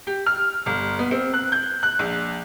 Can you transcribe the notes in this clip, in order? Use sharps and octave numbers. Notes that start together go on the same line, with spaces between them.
G4
F6
G1
B3
C4
F#6
G6
F#6
A#1